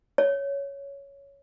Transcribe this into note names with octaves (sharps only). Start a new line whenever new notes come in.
C#5